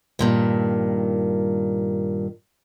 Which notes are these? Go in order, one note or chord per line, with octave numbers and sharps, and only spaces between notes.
G2 A#2 D#3